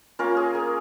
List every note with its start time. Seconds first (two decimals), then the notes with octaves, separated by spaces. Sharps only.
0.19 A#3 C#4 F4 A#4
0.37 G#4
0.55 A#4